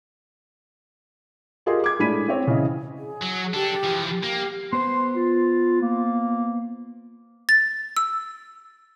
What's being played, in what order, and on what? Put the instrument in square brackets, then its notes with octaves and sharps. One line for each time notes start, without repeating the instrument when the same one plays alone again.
[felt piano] F4 G4 G#4 A#4 D#5 C6
D6 G#6
A2 G#3 D4 B5 B6 D#7
C4 C#5
C#3 E3 D#5
[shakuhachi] G#4
[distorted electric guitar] F#3
[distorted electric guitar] D4 A4 [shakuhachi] G4
[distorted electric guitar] E3 F3
[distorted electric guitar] A#3 [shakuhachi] G4
[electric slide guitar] B3 C5 [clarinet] C6
[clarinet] F4
A#3
[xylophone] A6
E6